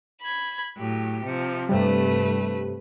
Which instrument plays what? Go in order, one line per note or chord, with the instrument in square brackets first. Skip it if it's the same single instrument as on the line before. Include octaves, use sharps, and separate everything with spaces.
[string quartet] B5 G#6
A2 F#3 G4
C3 F3
[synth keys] G2 C3 G3 [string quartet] A3 B4